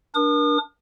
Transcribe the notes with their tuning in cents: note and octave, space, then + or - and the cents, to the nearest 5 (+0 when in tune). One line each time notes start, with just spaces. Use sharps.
D4 +0 A#4 +35 D#6 -40